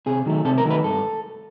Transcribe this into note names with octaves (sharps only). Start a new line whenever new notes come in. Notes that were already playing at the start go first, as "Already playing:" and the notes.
C3 G#4
D#3 F#3 A3
C3 A4
A#4
D#3 F#3 A3
B4
G2 A4